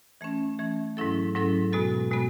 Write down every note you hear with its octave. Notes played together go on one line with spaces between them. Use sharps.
E3 A3 C#4
E3 A3 C#4
G#2 F#3 C#4 E4 A4
G#2 F#3 C#4 E4 A4
B2 G#3 B3 F#4 A4
B2 G#3 B3 F#4